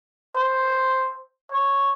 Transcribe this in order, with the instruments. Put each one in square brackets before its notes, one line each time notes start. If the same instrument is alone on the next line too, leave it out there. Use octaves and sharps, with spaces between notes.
[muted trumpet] C5
C#5